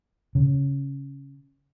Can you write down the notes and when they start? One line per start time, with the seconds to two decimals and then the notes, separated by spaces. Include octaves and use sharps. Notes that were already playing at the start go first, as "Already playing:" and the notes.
0.35 C#3